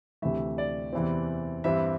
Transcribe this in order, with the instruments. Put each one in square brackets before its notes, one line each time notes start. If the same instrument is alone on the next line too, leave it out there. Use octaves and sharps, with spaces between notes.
[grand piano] D2 C3 E3 A3 E5
D5
E2 C3 E3 C4
G2 E3 C4 E5